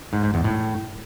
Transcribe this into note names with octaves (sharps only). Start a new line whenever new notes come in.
G#2
G#2
E2
A2